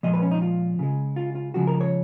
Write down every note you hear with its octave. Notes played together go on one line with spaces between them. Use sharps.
A#2 F3 G#3 D#5
B4
C#4
D#4
F4
C#3 G#3
F4
F4
C#3 F3 G#3 F#4
A#4
C#5